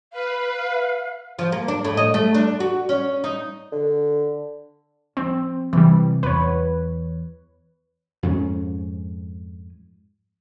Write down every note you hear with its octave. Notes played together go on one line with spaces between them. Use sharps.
B4 F5
F3
A#3
D4
A2
D#5
A3
D4
F#4
C#4
D#4
D3
F3 C4
C3 E3 G3
E2 B4 C#5
F2 G#2 G3 C#4